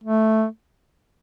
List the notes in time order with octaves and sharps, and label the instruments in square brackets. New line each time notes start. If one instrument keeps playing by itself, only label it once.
[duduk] A3